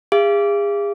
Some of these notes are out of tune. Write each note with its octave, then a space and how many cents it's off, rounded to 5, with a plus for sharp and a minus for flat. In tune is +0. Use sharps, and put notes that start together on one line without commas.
G#4 -35 F5 -40